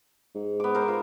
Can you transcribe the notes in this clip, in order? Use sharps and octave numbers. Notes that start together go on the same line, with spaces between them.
G#2
B3 D6
A#4 C5
F4